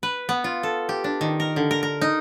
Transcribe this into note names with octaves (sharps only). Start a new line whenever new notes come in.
B4
B3
F4
A4
G4
D4
D#3
A#4
D3
A#4
A#4
D#4